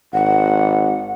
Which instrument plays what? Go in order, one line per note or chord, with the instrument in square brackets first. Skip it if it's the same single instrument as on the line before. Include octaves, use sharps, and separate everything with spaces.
[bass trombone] G#1 [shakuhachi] F#5